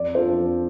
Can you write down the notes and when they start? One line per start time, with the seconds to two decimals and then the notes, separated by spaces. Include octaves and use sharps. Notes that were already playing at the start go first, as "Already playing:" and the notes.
Already playing: F2 D5
0.15 F3 D4 F4 A4 C5
0.38 F2